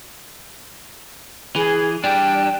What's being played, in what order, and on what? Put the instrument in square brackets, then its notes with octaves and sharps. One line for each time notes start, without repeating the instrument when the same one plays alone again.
[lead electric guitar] E3 [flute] G#4
[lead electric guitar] G3 D4 [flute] G5